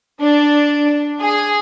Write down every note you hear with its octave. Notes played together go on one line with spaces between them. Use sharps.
D4
G#4